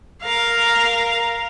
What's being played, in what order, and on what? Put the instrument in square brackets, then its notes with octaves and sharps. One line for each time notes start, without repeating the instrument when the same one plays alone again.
[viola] A#4 F5